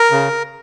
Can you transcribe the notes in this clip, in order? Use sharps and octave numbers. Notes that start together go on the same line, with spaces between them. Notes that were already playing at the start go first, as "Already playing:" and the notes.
Already playing: A#4
C#3